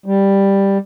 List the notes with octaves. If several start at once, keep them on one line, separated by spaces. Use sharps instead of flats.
G3